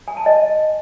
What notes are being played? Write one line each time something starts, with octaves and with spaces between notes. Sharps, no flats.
G#5
A5
D#5